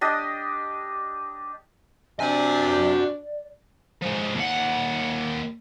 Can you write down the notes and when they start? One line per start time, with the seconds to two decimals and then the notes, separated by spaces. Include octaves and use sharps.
0.01 D4 G4 D#5
2.20 C3 D4 F#4 D5 G#5
4.02 F3 G#3
4.36 D#2 F#5